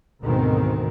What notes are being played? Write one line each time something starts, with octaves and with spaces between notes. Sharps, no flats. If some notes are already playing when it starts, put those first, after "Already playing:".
D2 G#2 B2 D#3 C4